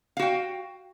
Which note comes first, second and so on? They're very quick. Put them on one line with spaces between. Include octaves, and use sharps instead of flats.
F5 F#4 G5